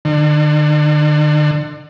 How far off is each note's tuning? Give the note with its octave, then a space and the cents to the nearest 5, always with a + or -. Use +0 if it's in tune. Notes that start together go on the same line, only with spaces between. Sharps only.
D3 +40